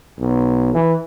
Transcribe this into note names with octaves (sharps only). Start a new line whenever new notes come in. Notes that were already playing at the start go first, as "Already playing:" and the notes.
B1
E3